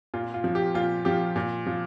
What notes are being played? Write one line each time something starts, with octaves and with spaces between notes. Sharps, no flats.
A#2 F4
F4
F3
G4
A#2 F4
F3 G4
A#2
F3